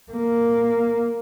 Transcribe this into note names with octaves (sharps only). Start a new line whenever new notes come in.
A#3